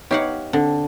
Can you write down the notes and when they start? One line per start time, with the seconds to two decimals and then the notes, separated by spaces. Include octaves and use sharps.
0.11 B3 D#4 G4 C#5 F5 F#5
0.53 D3 C4